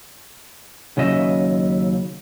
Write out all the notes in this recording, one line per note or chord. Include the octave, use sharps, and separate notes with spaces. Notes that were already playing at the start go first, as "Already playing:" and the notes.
D#2 C#3 F#3 D#5 E5